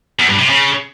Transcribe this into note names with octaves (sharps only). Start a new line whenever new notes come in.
E2
G2
C3
C#3